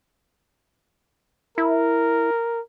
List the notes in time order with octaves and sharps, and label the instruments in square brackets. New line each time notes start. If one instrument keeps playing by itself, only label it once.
[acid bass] E4 [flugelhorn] A#4